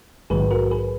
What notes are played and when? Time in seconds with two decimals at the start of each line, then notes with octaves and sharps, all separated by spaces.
0.30 A#1 G#2 D#3 F#3 G#4 B4
0.51 F#4 A#4
0.71 G#4 B4